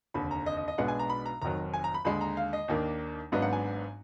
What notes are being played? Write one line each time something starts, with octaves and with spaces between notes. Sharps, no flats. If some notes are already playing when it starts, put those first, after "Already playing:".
F1 D#2 D3 B5
A#5
D#5
D#5
D#5
B1 B2 G#3 B3 D4 F#5
G#5
A#5
B5
A#5
F1 F2 D#3 F#3 A#5
G#5
A#5
B5
D#2 D3 G#3 B5
A#5
F5
D#5
D#2 D#3 A#3 D4
G#1 G#2 F#3 B3 D4 D#5
F#5
G#5